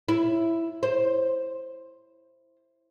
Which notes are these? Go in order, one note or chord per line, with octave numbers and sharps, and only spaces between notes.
E4
C5